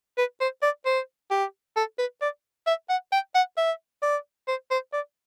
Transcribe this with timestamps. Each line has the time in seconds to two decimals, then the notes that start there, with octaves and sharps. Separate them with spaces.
0.17 B4
0.40 C5
0.62 D5
0.85 C5
1.31 G4
1.76 A4
1.98 B4
2.21 D5
2.66 E5
2.89 F#5
3.12 G5
3.35 F#5
3.57 E5
4.02 D5
4.48 C5
4.70 C5
4.93 D5